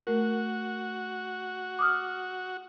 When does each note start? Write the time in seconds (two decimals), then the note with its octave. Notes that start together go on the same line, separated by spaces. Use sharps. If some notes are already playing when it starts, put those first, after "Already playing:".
0.07 A3 F#4 A#4
1.79 D6 D#6 F6